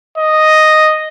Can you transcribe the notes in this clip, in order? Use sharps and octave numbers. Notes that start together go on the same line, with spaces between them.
D#5